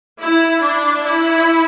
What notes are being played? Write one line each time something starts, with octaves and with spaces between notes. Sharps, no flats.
E4
D4
E4